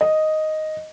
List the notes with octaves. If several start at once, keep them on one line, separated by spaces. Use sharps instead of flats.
D#5